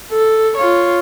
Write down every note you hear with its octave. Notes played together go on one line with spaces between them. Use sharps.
A4
F4 C#5